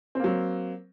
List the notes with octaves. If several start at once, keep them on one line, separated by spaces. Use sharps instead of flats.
F#3 A#3 C4